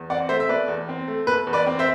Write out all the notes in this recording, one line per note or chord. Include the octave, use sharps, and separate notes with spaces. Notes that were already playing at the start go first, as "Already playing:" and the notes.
Already playing: E2
C4 D5 F#5
A3 C5 E5
E5
B2 B4 D5
E2
C4
A3
B2 B4
E2
B4 D5
C4
C5 E5